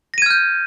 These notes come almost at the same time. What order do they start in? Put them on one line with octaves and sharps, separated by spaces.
A#6 D#7 G#6 F6 G6